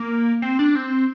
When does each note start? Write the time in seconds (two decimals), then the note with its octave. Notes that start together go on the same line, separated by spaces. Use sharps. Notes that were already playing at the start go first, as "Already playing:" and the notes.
Already playing: A#3
0.42 C4
0.59 D4
0.75 C4